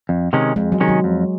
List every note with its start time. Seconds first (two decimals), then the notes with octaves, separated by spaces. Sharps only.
0.09 F2
0.33 C3 D#3 G#3 C#4
0.56 F2 G#3
0.72 F#3
0.80 C3 D#3 G#3 C#4
0.88 F#3
1.04 F2